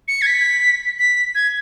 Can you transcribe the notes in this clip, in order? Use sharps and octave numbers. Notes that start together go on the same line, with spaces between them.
C#7
G#6
B6
B6
G#6